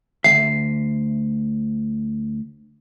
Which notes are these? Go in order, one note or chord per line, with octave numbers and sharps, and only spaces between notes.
D2 D#3 E5 C7